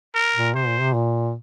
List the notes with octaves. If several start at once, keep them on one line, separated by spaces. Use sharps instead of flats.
A#4
A#2
C3 C5
A#2
C3
A#2